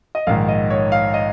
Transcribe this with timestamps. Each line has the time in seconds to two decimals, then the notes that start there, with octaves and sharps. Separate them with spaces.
0.15 D#5
0.27 A#1 G#2 D#3 F5
0.49 D#5
0.70 C#5
0.92 F5
1.14 D#5